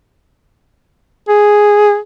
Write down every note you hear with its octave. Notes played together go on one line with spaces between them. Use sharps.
G#4